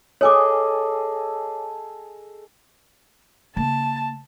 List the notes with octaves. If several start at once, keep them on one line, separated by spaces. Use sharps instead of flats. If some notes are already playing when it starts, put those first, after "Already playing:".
G#4 A4 C#5 D#5 G#5 D6
C#3 A#3 A5